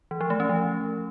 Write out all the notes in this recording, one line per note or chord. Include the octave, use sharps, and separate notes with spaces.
E3
F3
A3
C#4
F3